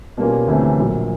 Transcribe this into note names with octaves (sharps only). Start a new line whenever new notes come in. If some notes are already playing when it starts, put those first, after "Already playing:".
B2 G3 A#3 C#4 F4
D2 C3 E3 A3 C#4
A#1 A#2 F#3